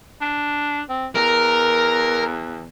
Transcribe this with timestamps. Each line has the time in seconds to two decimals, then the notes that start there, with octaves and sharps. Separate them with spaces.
0.21 D4
0.89 C4
1.15 E2 A#4